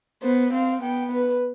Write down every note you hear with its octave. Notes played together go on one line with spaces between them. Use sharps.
B3 C5
C4 F5
B3 G5
B4